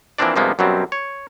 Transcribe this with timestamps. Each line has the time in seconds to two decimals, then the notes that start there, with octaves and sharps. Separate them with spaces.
0.18 E3 F3 A#3 C4 D4 D5
0.36 G2 C3 F3 G#3 A#3 B3
0.59 F#2 B2 F#3 G3 C4
0.92 C#5